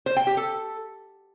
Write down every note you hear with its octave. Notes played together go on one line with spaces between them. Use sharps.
C5
G5
G4
A4